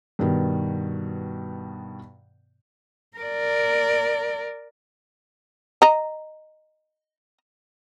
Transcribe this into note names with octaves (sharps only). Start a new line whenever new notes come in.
G2 B2 D#3 B3
A#4 D5
D#5 A#5